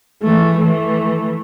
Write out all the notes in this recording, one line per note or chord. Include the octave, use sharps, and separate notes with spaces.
E3 A3
E3 A3